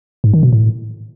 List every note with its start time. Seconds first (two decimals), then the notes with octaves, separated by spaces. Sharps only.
0.24 G#2
0.33 D#3
0.43 B2
0.53 A2